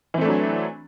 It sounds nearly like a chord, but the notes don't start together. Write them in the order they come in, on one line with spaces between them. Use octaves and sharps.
E3 C4 A3 D4 F#3